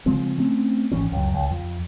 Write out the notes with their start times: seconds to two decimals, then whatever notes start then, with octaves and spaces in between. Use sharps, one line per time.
0.06 C#3 F3 G#3 C4
0.38 A3 C4 C#4
0.92 G#1 E3 C#4
1.12 C#2 F#2
1.34 C#2
1.51 F2